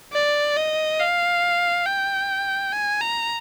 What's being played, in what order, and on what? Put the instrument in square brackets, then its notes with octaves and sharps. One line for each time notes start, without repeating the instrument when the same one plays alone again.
[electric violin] D5
D#5
F5
G5
G#5
A#5